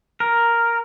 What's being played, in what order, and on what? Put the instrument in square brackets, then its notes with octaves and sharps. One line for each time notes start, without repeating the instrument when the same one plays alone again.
[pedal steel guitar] A#4